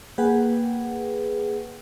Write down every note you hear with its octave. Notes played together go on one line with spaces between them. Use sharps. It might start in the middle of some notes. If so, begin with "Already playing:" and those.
A#3 G#4 B4 F#5 G5